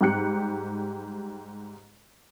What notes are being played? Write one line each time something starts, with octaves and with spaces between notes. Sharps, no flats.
G#2 G3 G4 F#6 C#7